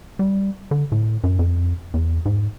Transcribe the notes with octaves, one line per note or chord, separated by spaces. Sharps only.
G3
D3
A2
F#2
F2
E2
G#2